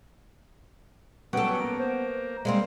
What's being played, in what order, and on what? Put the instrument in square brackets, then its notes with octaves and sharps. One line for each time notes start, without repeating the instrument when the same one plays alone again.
[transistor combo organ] F#3 G3 C#4 [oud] B3 A4 [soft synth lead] D7
[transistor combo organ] A#3
[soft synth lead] C5
[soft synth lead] G3 [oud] G#3 A#3 C4